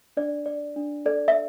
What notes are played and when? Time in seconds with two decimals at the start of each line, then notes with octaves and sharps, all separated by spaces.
0.17 D4 D5
0.46 D5
0.76 D4
1.06 A4 D5
1.28 E5